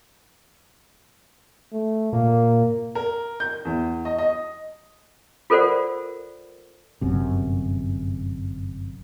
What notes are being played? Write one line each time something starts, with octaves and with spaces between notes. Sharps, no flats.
A3
A#2 A#3
A#4
G6
E2
D#5
D#5
F4 A4 A#4 C5 D5 F#5
G1 F#2 C3